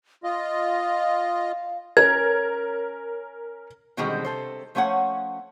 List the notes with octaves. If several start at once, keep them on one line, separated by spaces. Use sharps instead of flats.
F4 D#5 F5
C#4 A#4 G#6
B2 D3 D#3 G3 G#3 C4
C3 A4 C5
F3 A3 C#4 C#5 F#5